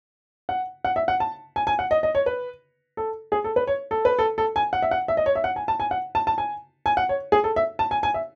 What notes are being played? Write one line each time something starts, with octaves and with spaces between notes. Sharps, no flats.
F#5
F#5
E5
F#5
A5
G#5
G#5
F#5
D#5
D#5
C#5
B4
A4
G#4
A4
B4
C#5
A4
B4
A4
A4
G#5
F#5
E5
F#5
E5
D#5
C#5
E5
F#5
G#5
A5
G#5
F#5
A5
A5
G#5
G#5
F#5
C#5
G#4
A4
E5
A5
G#5
G#5
E5